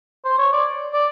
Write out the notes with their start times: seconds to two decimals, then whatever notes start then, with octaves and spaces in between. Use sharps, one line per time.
0.25 C5
0.39 C#5
0.53 D5
0.93 D5